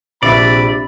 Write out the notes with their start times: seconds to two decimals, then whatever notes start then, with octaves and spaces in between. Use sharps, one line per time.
0.23 A#1 C3 D4 D5 E5 B5